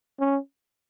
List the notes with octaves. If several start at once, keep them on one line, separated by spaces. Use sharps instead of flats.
C#4